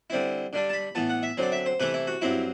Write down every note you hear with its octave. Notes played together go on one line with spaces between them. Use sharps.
D3 G3 C4 E4
D3 G3 D4
A5
B5
A2 E3 B3 A5
F#5
E5
D3 F#3 C4 D5
E5
C5
C3 E3 A3 E4 B4
E4
F#4
G2 F#3 C4 E4